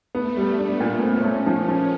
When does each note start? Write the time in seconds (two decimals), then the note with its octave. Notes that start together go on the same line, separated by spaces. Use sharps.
0.15 A3 B3
0.37 G3
0.58 B3 D4
0.81 A#2
1.02 C4 C#4
1.24 A3
1.46 F3
1.68 F3